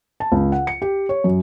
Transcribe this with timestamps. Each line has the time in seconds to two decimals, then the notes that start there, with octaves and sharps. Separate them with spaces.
0.20 A5
0.32 C#2
0.52 F#5
0.67 C#7
0.82 G4
1.09 C#5
1.24 F#2